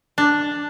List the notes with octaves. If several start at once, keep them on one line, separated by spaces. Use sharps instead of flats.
D4